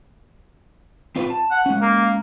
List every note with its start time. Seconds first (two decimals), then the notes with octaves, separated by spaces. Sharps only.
1.16 C4 F4 B4
1.30 A5
1.51 F#5
1.66 G#3 C#4
1.82 A#3